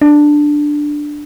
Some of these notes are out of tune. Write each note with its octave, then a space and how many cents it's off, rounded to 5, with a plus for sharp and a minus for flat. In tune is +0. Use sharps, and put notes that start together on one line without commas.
D4 +5